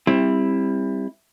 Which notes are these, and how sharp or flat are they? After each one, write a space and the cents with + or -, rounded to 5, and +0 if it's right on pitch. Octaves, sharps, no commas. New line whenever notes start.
G3 +25 C4 +20 E4 +0